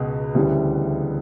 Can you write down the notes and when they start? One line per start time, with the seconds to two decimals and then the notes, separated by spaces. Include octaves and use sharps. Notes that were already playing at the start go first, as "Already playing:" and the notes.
Already playing: C#2 B2
0.35 D2 C#3 E3 G3